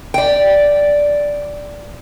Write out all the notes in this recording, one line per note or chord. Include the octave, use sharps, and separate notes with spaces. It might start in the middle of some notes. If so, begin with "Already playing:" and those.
D5 G5